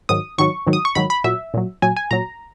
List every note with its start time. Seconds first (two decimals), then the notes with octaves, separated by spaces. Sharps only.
0.09 G#2 D#3 F#3 D#6
0.38 G#2 D#3 F#3 C#6
0.67 G#2 D#3 F#3
0.73 D#6
0.85 C#6
0.95 G#2 D#3 F#3 B5
1.10 B5
1.24 A#2 F#3 E5
1.54 A#2 F#3
1.82 A#2 F#3 G#5
1.97 G#5
2.11 A#2 F#3 A#5